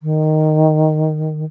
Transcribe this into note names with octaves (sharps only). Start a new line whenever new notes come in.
D#3